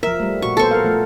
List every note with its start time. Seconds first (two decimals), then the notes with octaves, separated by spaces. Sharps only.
0.03 F3 A#4 E5
0.20 G3 A3
0.42 A#2 F#4 C#6
0.57 B3 A4 C5 C#6
0.71 A#4 F5
0.84 F3 A3